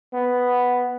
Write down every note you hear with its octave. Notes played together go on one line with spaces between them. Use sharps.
B3